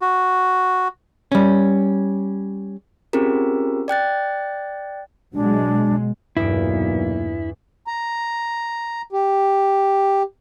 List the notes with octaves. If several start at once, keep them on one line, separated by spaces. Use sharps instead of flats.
F#4
G3 C#4
C4 C#4 F4 G4 G#4 A#4
D5 G5 F#6 A6
B2 F#3 G#3 D4
B1 E2 G2 A#2 E4 D7
A#5
G4